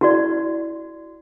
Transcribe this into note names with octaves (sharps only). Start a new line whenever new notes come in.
E4 F#4 D5